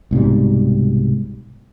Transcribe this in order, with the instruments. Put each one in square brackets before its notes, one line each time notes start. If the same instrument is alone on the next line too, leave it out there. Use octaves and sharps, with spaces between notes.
[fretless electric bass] C2 G#2 B2 G3